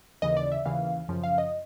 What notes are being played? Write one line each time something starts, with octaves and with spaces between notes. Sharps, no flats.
D#2 C#3 E3 D#5
D5
E5
D#2 C#3 E3 F5
F#2 C#3 F3
F5
D#5